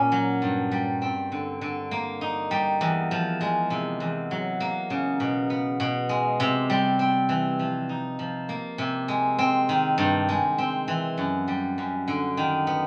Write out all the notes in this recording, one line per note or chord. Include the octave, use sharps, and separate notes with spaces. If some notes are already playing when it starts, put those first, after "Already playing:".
Already playing: A#2 A#3 C#4
F#3
G2
G3
C4
D3
D3
A#3
D#4
G3
E2
F3
G#3
C3
E2
F#3
A#3
C#3
B2
B3
B2
G#3
C3
G3
C4
E3
F3
D#4
F3
A#3
C3
G#3
C4
D#3
G2
G#3
C4
E3
F#2
G3
F#2
D3
D#3
B3